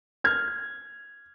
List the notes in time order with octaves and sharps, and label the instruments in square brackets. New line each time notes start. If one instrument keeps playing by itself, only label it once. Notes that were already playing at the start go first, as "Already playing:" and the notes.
[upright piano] F6 G#6